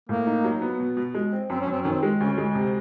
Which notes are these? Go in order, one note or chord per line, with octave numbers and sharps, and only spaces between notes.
A2 A#3
D#4
F#3
B3
B2
B2
G#3
C4
F#2 C4
C#4
F#2 C4
D#3 C#4
C4
G#3
D2 C#4
G#3
C3